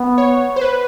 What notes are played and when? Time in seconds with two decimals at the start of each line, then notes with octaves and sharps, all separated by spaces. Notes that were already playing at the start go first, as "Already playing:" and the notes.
Already playing: B3
0.18 C#5
0.56 C5
0.61 B4